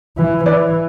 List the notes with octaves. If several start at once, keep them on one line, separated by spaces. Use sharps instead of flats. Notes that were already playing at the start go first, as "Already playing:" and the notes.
E3
E3 B4 D5